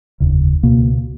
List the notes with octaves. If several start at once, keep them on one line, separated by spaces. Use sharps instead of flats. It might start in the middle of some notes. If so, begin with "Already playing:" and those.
F1 D#2 C#3
C#2 B2 A#3